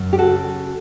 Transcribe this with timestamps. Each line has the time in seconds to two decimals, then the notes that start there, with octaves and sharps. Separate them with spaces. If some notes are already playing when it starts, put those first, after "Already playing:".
Already playing: F#2
0.13 G4
0.18 C#3 F#4 A4